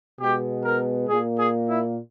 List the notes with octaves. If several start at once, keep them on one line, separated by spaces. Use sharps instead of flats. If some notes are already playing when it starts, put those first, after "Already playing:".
B2 G#3 B3 G4
A#4
A#2 A#3 G#4
G#4
E4